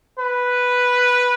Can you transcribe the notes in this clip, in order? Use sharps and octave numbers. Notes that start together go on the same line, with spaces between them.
B4